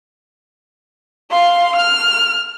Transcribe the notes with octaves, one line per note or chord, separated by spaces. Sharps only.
F5 C6
F6